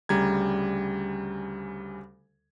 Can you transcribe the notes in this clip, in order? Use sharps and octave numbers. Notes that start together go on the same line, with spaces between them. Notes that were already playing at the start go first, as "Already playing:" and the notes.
D2 C#3 G3 A#5 G#6